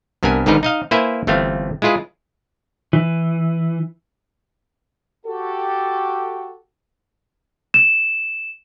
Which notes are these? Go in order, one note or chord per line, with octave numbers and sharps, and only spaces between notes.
C2 G2 B3 A#4 G#5
G#1 G#2 D3 D#4 A#4 B4
D#4 D#5 F5
A#3 E4 B4 C5 E5 G#5
G1 E3 A3 C4 F5
G#3 E4 F4 G#4 B4
E3
F#4 G4 A4
E7